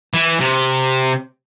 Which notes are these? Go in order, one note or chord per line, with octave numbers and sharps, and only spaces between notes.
E3
C3